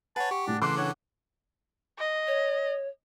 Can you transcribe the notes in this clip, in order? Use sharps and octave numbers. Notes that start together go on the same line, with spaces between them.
B4 C#5 F#5 G#5 A5
G4 C#6
A2 D4
C#3 E3 A4 C6 D6 F#6
D4 C#5 F#5 F#7
D#5
C#5